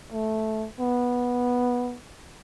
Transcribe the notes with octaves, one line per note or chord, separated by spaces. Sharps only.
A3
B3